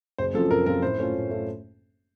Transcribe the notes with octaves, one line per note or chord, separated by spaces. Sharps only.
F#1 C5
F#2 F3 C4 F4 A4
F#1 A#4
F#2 F3 C4 F4 A#4
A2 C5
A3 C#4 F4
A2
A3 C#4 F4